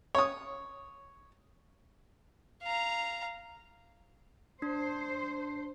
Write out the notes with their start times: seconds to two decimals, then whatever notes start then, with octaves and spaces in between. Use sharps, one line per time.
0.15 C#5 D#6
2.62 F5 A#5
4.62 D4 C5